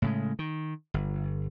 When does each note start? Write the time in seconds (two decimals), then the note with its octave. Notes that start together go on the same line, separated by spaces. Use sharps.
0.02 A2 C#3 G#3
0.39 D#3
0.94 G1